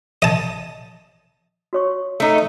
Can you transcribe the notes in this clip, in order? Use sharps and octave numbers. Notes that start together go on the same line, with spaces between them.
D#5 A5
F#4 C#5 C#6
A3 D#4